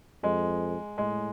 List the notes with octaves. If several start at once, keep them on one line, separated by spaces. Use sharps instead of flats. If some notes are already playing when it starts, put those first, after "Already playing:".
F2 G#3
A2 G#3